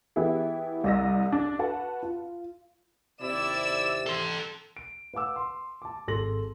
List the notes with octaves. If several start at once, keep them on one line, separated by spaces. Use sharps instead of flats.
E3 B3 E4 G4 G#4
C2 D5 D#5 E6 A#6
D4
F#4 B4 F#5 A5
F4
D#2 C3 E4 D5 E6 E7
A4 C6
D7
B4 F5 F#5 D6 E6
C6
A5 D6
G#1 G#4 A4 C6 A#6 F#7